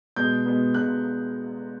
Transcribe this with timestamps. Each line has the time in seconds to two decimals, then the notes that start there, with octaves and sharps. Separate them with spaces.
0.16 B2 G#3 B3 G6
0.46 B2 G#3 B3
0.74 B2 G#3 B3 F#6